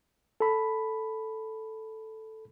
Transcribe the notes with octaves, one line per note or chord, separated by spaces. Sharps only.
A4 B5